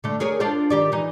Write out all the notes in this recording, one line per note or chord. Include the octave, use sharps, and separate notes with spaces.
D3 A3
G#4 A#4 C#5
D4 F4 C5
D#3 G4 D5
E3 D#4